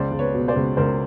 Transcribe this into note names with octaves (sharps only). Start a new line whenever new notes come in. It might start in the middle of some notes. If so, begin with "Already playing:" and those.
Already playing: C#2 C5 D5
C#2
B4 C#5
B2
C5 D5
C#2
C#2 A#4 C5